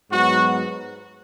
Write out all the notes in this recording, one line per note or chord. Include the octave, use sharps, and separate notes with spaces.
G#2 F#3 B3 F#4